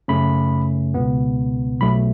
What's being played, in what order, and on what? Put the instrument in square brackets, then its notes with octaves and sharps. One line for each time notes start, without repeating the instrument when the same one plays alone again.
[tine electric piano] F#2 C#3 A3 C#4 B5
C#2 B2 B3
B1 B2 F#3 A3 B5